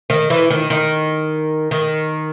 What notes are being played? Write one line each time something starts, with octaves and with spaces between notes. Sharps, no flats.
D#3
E3
D#3
D#3
D#3